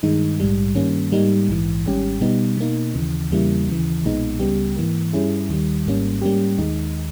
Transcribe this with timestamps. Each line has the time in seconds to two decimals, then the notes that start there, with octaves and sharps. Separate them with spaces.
0.03 G2 D#3 G#3 D#4
0.40 A#1 G#2 G3
0.75 G2 D#3 G3 A#3 C#4
1.12 G#2 G3 A#3 D#4
1.48 A#1 G#2 E3
1.85 G#1 G#2 G3 C#4 G4
2.21 B2 G3 B3 D#4
2.57 B2 A#3 D#4
2.94 D#2 C#3 E3
3.31 E2 C#3 G3 A#3 E4
3.68 D#2 C#3 E3
4.04 B1 A#2 G#3 B3 D#4
4.39 C#2 C#3 G3 B3 G4
4.76 G#2 E3 A#3
5.13 G2 G3 C#4 E4 G#4
5.49 D#2 D#3 G3
5.86 G#1 G#2 G3 A#3 C#4
6.22 G#2 G3 A#3 C#4 G4
6.58 D#2 D#3 G#3 D#4